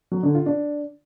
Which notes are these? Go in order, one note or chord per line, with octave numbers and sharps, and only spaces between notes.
F#3
D3
F4
D4